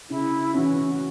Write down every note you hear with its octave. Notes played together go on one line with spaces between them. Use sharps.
C#3 E4
E3 C#4 F#4